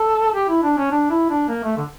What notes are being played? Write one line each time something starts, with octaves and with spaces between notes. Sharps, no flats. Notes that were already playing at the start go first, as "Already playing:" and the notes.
Already playing: A4
G4
E4
D4
C#4
D4
E4
D4
A#3
A3
D3